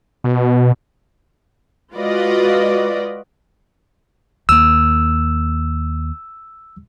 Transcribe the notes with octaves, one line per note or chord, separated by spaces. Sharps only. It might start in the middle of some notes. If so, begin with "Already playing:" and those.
B2
G#3 F4 F#4 B4 D5 D#5
D#2 A#3 E6